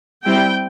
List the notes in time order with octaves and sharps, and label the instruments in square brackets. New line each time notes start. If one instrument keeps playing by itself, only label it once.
[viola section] G3 C4 E4 G5